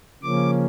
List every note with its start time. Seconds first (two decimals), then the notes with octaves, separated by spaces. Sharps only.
0.23 C#3 F3 A#3 C#4 D6